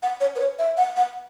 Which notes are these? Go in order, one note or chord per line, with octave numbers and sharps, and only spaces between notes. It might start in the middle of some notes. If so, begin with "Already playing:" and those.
F#5
C#5
B4
C#5
E5
F#5
F#5